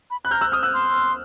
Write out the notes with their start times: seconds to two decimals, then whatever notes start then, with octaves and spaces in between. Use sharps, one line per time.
0.10 B5
0.24 B5 F#6
0.31 A#5 F6 G6
0.41 E6 F#6
0.52 D#6 F6
0.63 E6 F#6
0.74 C6